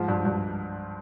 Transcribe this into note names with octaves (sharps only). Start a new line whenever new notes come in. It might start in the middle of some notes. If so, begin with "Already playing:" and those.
Already playing: G#2 F3
G2
G2